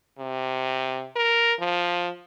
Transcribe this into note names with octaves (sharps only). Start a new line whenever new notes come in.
C3
A#4
F3